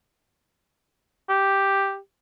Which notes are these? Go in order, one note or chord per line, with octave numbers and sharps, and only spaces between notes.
G4